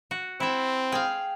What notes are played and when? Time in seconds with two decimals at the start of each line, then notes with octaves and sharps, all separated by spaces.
0.11 F#4
0.40 C4 E4 E5
0.92 G#4 F5 G5